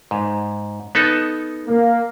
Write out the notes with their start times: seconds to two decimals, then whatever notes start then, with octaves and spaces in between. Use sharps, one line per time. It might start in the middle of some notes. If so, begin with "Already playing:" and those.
0.11 G#2
0.95 B3 D#4 A4
1.67 A#3